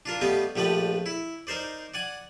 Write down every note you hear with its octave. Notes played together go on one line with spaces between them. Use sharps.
D4 F4 A#4
G3 A3 B3 G4 D#5 F5
A#1 F3 A3 G4 B4 D5
E4
D#4 A#4 C5 D5
D5 F#5 G#5